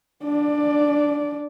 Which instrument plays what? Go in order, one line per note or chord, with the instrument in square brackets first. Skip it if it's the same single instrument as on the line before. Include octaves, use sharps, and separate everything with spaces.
[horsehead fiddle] D4 D5